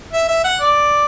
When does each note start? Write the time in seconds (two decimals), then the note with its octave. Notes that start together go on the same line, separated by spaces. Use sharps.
0.13 E5
0.28 E5
0.44 F#5
0.61 D5